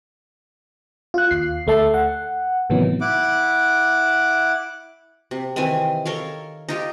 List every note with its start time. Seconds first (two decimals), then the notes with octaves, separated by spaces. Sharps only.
1.14 F4 F#6
1.31 D#2 C7
1.67 D2 A3 E5 A5 C7
1.94 F#5
2.70 A2 C3 D#3 E3 F#3 B3
3.01 E4 F#5 D6
5.31 C3
5.56 D#3 E3 C4 G#5
6.05 A4 A#4 C#5 F5
6.69 D#4 F4 G4